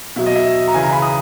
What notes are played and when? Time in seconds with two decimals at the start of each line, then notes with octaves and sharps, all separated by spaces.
0.16 B2 F#3 E5
0.26 D#5
0.36 E5
0.68 A#5
0.74 C#3 E3 G#5
0.83 A#5
0.93 B5
1.02 D#6